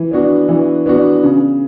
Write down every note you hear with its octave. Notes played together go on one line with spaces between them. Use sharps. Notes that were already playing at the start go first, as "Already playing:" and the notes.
Already playing: E3
B3 D4 F#4
E3
B3 D4 F#4
C#3